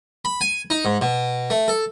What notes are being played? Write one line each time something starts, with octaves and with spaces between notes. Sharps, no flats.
B5
G#5
D#4
G#2
B2
A3
A4